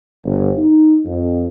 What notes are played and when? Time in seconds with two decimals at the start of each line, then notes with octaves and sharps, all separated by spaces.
0.25 G1
0.58 D#4
1.05 F2